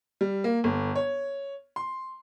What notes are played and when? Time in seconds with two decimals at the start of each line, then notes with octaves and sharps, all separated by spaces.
0.21 G3
0.44 A#3
0.64 G1
0.96 C#5
1.76 C6